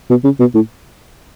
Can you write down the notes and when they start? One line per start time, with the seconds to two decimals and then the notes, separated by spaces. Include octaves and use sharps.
0.10 B2
0.24 C#3
0.40 B2
0.55 A2